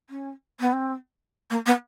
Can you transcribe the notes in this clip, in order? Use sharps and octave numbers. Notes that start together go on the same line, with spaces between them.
C#4
B3
C4
A#3
B3